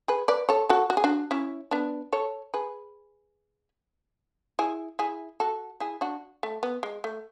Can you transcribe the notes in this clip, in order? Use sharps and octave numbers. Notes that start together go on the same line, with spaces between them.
G#4 B4
B4 D5
A4 C#5
F#4 A4
F#4
G#4
D4 F#4
C#4 E4
B3 D4
A4 C#5
G#4 B4
E4 G#4
E4 G#4
F#4 A4
E4 G#4
D4 F#4
A3
B3
G#3
A3